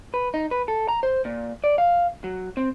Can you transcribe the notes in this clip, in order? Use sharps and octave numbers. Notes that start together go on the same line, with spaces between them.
B4
D#4
B4
A4
A#5
C5
A#2
D5
F5
F#3
C4